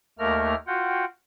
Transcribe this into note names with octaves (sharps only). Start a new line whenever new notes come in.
D#2 A3 A#3 A#4 A#5 F6
F4 F#4 F#5 G5